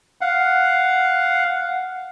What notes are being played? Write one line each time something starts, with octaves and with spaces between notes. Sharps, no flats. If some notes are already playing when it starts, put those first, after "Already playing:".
F5 F#5